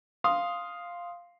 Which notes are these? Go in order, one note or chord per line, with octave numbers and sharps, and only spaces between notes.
F5 C6 D#6